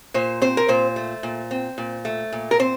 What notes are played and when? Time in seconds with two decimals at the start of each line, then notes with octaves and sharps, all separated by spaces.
0.14 A#2 C5
0.42 C4 C5
0.57 A#4
0.68 A#2 C5
0.96 A3
1.23 A#2
1.51 C4
1.78 A#2
2.05 A3
2.32 A#2
2.51 A#4
2.59 C4 C5